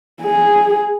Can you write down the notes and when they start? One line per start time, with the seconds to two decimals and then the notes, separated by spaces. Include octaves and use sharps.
0.22 G#4